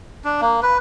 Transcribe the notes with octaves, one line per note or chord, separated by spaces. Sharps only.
D4
A#3
B4